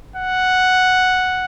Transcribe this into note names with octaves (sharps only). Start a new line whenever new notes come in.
F#5